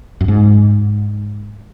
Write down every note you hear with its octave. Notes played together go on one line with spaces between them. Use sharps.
F#2
G#2